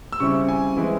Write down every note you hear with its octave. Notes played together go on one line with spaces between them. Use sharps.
E6
C#3 G3 C4 E4 C#6
G#5
E3 G#3 C4 E4